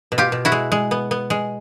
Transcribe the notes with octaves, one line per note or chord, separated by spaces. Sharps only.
B2
F4 G4
B2
E4 F#4
G#3
G#3
B3
B3
G#3